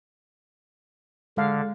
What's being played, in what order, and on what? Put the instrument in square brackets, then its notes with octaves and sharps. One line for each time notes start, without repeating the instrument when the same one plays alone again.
[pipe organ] D3 [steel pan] G#3 F5